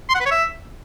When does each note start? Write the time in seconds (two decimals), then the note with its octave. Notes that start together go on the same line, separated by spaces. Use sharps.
0.09 C6
0.15 F#5
0.20 B4
0.26 C#5
0.31 E5